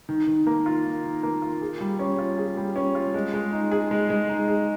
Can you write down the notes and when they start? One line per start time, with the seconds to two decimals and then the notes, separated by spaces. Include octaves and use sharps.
0.09 D#3
0.27 D#3
0.47 A#3
0.66 F4
0.85 D#3
1.04 D#3
1.23 A#3
1.42 F4
1.62 G#4
1.81 G3
1.99 C#4
2.18 F4
2.38 G#4
2.57 G3
2.76 C#4
2.95 F4
3.14 G#3
3.34 G#3
3.52 D#4
3.72 G#4
3.91 G#3
4.10 G#3
4.29 D#4
4.48 G#4